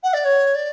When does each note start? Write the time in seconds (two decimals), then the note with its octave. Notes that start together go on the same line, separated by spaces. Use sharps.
0.03 F#5
0.13 D5
0.24 C#5
0.54 D5